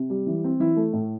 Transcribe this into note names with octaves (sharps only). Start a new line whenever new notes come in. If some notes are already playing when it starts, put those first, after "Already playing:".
Already playing: C3
G3
E3
C4
E3 E4
A3
A2